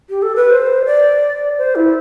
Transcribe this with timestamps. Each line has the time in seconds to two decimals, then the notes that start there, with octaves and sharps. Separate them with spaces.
0.10 G4
0.22 A4
0.36 B4
0.51 C5
0.85 D5
1.58 C5
1.75 E4